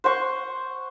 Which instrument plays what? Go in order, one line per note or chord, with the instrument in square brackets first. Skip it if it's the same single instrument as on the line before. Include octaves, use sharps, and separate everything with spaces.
[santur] C5 F#5 C#6